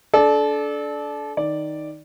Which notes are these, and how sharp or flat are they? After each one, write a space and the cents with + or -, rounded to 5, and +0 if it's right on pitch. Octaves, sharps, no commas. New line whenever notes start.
D4 -20 A4 -30 D5 +10
D#3 +0 D5 +0